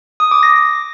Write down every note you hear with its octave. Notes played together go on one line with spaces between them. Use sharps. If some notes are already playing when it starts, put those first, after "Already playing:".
D#6
D6
A#6